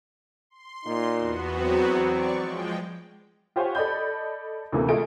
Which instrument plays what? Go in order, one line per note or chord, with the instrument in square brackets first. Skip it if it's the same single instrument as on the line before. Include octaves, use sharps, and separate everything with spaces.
[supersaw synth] C6
[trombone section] A#2 D#4
[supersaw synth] E2 B3 F#4
[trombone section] F#3 C4
[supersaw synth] D5 C#6
F3 G#3 G5
[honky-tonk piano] F4 G4 C5 C#5 F#5 G#5
A4 D5 D#5 B5 G6
D2 C3 E3 A3 A#3
G#3 A3 F4 G#4 D#5 D7